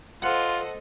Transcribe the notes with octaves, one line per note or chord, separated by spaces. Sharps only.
F4 A4 C5 D#5 F#5